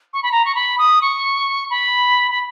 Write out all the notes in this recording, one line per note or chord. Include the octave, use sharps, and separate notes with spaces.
C#6
B5
A#5
C#6
B5
D#6
C#6
B5
B5